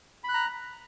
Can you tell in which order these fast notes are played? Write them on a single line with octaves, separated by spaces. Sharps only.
B5 F#6 A#5